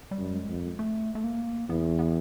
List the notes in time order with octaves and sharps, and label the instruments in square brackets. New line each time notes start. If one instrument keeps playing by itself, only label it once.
[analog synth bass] G3
[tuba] F#2
[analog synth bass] G#3
[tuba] F2
[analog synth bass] A3
A3
A#3
[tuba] E2 [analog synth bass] B3
[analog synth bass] B3